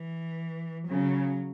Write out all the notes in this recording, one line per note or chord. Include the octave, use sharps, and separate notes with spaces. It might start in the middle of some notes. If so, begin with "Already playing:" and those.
Already playing: E3
C#3 F#3